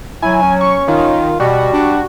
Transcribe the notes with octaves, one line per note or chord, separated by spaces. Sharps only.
F#3 E4 G#5
C#4
C#6
D#3 F4
B2 G3 F#4
D4